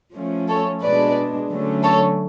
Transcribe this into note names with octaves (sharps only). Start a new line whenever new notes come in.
F3 A3 C#4
A4 C#5
B2 G#3 D4 B4 D5
D3 F#3 A3 C#4
A4 C#5